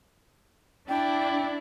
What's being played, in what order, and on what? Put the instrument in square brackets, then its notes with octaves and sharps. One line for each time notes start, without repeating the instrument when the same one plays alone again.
[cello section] D4 [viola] E4 D5 [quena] G5